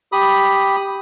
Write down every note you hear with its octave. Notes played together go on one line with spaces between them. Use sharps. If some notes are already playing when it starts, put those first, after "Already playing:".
G4 B5 D#6